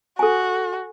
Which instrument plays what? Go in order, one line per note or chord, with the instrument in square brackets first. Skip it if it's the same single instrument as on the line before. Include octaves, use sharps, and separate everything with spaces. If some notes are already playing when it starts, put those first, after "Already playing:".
[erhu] F#4 [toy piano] A4 G#5